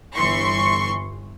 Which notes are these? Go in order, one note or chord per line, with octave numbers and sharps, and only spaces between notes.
G1 E3 C6 C#6